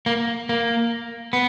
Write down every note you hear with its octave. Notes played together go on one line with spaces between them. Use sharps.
A#3
A#3
B3